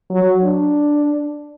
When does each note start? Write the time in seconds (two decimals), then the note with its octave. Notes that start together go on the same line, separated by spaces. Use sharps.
0.11 F#3
0.43 D4